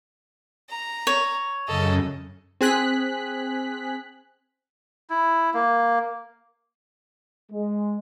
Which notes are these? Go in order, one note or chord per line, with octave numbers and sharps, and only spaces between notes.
A#5
C#5
F#2 C#3 A4 D#5
C4 G#4 F#6 B6
E4
A#3
G#3